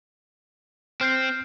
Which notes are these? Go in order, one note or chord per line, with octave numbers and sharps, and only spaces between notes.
C4 F6 G6 C7